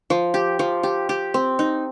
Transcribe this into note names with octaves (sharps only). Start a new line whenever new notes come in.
F3
G4
F3
G4
G4
C4
D#4